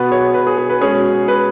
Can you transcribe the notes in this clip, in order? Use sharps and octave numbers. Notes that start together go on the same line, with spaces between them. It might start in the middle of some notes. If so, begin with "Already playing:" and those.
Already playing: B2 B3 B4
G#4 C#5
B4
G#4
G#4
B4
B2 G#3 C#4 G#4 C#5
B4